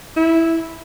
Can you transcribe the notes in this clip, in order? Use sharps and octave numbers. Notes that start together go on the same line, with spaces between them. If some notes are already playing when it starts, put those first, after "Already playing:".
E4